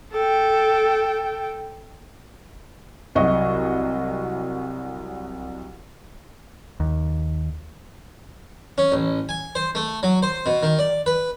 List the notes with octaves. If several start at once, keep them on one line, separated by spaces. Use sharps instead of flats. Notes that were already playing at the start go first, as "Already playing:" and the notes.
A4 G5
C2 F#3 F#4 D#5 C#6
D#2
C#4
A1
G#5
C5
A3
F#3
C5
B2
D#3
D5
B4